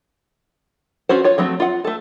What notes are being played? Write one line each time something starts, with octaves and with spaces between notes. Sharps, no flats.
C#4 F4 F#4 C5
F4 C#5
F3 F#3 A3 C4
F4 F#5
A3 A4